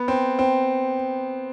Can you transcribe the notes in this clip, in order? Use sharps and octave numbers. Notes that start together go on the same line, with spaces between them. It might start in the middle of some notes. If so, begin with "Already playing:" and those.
Already playing: B3
C4
C4